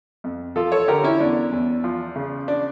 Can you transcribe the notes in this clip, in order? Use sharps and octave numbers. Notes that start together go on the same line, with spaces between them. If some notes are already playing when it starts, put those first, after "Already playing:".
F2
F3 F4 A4
A4 C#5
D3 G4 A#4
C#4 E4
E2 D4
E2
F3
C#3
D4